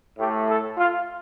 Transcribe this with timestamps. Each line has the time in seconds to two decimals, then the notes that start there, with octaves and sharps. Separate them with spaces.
0.17 A2 A3 G4
0.48 A4
0.77 F4